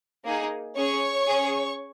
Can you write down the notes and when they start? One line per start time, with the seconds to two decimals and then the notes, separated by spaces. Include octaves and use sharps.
0.25 A#3 D#4 G#4
0.76 C#4 G#4 C#5 C#6
1.28 C#4 G#4